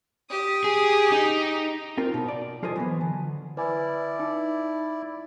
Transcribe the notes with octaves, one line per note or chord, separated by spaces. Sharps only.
G4 D#6
G#4
D#4
C4 D#4 F4 A#4
B2
D5
F3 F4 A4 C5 D#5 G#5
E3 F#3 B3
D3
E4 B4 D5 G#5
D#4